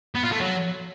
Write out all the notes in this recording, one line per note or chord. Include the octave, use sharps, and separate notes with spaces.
B3
F4
A3
F#3